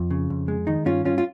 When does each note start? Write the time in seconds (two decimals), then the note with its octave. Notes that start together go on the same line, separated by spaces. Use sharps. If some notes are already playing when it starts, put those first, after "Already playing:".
Already playing: F2
0.11 C#3
0.30 F2
0.48 G#3
0.67 D#3 D#4
0.85 G2 C#4 F4
1.04 G2 C#4 F4
1.18 F4